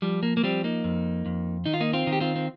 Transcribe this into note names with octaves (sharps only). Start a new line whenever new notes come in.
F3 G3
A#3
A#3
F3 G3 C4
A#3 D#4
F2
F2
D#3 D#4
F4
A#3 D#4
C4 F4
D#3
G4
C4 F4
C4